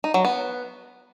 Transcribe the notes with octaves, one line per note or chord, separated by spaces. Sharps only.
D#4
F#3
B3